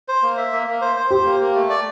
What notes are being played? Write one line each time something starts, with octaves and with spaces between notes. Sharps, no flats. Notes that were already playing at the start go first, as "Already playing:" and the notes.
C5
A#3
E5
A#3
A#3
C5
C5
G4 C5
A#3
A#3
A3
D5